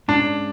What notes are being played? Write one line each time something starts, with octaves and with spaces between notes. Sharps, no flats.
G#2 G#3 C#4 D4